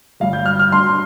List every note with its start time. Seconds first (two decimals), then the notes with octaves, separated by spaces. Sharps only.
0.20 G1 G2 G3 F5
0.33 G6
0.46 F6
0.59 F6
0.72 G2 G3 D4 C6